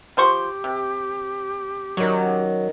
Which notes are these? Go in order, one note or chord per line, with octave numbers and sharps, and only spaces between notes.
F3 G4 C5 C#6
C3
D#3 F#3 C#4